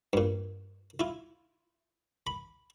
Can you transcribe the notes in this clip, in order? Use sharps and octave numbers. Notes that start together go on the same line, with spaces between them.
G2 A#2
E4 F4
B5